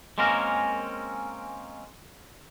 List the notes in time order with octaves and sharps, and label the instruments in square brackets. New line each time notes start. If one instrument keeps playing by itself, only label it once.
[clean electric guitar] G#3 A#3 C4 C#4 A#4